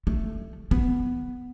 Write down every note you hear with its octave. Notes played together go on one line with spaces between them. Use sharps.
A3
B3